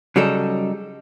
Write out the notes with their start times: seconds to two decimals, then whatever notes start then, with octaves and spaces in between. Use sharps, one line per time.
0.16 C#3 F#3 G3 D#4 A4